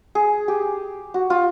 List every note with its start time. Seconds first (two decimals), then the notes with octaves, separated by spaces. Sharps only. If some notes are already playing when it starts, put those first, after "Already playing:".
0.15 G#4
0.48 G4
1.14 F#4
1.30 F4